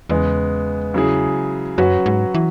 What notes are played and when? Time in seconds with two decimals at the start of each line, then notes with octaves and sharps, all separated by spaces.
0.09 E2 C#3 G#3 B3
0.94 C#3 F#3 E4 G#4
1.78 F#2 F#3 C#4 F#4 B4
2.06 G#2
2.34 E3